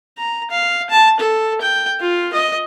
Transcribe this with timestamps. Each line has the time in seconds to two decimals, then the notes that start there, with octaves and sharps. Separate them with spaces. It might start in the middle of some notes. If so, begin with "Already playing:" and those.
0.17 A#5
0.51 F5
0.90 A5
1.20 A4
1.61 G5
2.00 F4
2.33 D#5